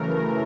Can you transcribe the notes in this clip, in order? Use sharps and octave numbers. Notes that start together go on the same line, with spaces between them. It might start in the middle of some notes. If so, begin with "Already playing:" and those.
Already playing: F#2 C#3 E3 A3 A#4